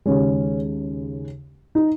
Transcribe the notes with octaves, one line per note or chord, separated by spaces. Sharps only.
D#2 C#3 G#3 C#4
D#4